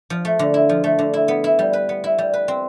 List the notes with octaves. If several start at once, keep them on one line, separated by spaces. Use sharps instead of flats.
F3
A3
D3
E4
F3
A3
D3
E4
B3
E4
G3
B4
B3
E4
G3
B4
C4